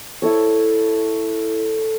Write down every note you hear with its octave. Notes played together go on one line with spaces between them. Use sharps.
E4 A4 C#5